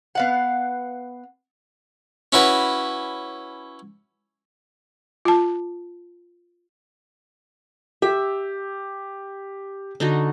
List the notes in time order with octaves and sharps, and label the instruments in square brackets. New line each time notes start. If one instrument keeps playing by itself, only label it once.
[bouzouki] B3 F5 F#5
[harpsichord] C#4 E4 F#4 B4
[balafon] F4 A5
[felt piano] G4 [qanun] E5
[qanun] D3 D#4 F#4